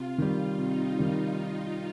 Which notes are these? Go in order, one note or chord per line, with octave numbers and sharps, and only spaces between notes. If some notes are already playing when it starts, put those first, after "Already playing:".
Already playing: C3 F4
D#3 G3
C3 D#4
D#3 G3